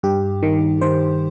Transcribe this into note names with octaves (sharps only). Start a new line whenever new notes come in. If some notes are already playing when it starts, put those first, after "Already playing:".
G2 G4
D#3
D#3 C5